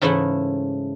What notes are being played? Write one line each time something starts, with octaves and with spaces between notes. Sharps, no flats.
G#2 C#3 E3 A3 E4 F#5